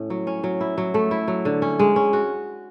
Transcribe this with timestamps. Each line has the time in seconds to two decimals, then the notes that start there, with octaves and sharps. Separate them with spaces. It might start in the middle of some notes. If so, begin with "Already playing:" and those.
Already playing: A2 C#4
0.10 F#3
0.27 C#4
0.44 F#3
0.61 E4
0.78 F#3
0.94 A3
1.11 E4
1.28 F#3
1.45 D3
1.62 C#4
1.79 G#3
1.96 C#4
2.13 F#4